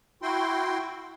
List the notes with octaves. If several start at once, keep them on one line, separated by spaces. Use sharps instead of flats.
E4 F#4 G5 C6